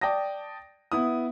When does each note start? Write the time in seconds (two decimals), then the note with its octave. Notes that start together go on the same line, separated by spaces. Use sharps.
0.01 D5 G5 A5 D#6 A#6
0.92 B3 E4 D#6